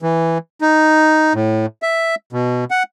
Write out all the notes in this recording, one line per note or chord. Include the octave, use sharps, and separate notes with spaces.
E3
D#4
A2
E5
B2
F#5